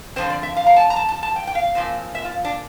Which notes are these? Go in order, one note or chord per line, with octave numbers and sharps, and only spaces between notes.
D3 F3 C4 C5
D5
E5
F5
A#5
A5
A#5
A5
A5
A5
G5
G5
F5
A#2 F3 C4
E5
F4
D4